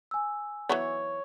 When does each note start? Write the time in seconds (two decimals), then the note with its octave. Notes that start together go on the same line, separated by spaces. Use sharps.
0.11 G#5 E6
0.69 E3 F#3 B3 C#5